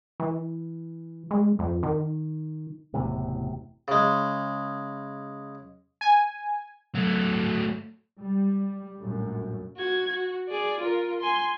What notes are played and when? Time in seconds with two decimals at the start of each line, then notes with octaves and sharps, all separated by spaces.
0.20 E3
1.31 G#3
1.59 F2
1.83 D#3
2.94 F#1 E2 A2 C3
3.88 C#3 G#3
6.01 G#5
6.95 F#3 A3
8.18 G3
9.00 A#1 F#2 A2
9.77 F#4 G#6
10.09 F#4
10.49 G#4 D5
10.80 F4 A#4
11.20 G#5 C6